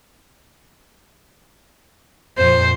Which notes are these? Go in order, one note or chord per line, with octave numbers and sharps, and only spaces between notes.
F2 A#2 C5